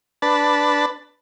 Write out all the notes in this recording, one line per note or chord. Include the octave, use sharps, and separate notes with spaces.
D4 B4 A5